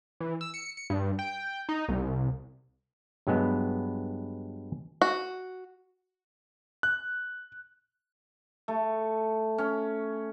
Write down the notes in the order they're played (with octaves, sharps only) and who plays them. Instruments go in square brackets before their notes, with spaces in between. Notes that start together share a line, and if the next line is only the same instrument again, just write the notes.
[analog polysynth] E3
E6
C#7
C#7
G2
G5
D#4
C2
[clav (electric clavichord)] G2 F#3 G#3 B3
[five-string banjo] F#4
[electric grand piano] F#6
[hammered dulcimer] A3
C#4